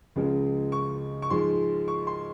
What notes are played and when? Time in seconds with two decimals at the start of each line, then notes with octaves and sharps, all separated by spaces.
0.16 C#2 C#3 F3 G#3
0.72 C#6
1.22 C#6
1.30 G#2 F3 G#3 C6
1.88 C#6
2.07 C6